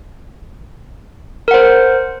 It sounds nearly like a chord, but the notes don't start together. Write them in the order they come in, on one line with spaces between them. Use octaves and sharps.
A#4 F#5 C5